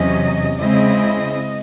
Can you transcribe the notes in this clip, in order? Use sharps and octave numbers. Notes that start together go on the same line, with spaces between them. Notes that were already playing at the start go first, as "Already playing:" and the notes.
Already playing: E2 C3 F#3 C#4 D#5
C#3 G#3 C4 E4 D#5